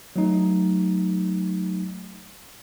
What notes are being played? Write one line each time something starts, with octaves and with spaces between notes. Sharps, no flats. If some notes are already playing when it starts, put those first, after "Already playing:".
F#3 A3 D#4